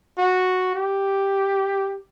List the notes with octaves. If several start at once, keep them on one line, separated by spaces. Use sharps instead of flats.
F#4
G4